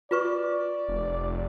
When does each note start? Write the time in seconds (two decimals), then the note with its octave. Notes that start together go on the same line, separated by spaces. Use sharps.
0.11 F4 B4 D5 C#6
0.89 F1